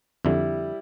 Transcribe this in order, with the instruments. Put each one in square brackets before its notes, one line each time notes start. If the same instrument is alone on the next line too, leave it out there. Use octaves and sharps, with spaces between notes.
[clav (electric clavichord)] F2 D3 [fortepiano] G3 E4